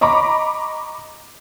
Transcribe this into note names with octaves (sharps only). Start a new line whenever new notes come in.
D#5 A#5 B5 C#6 D6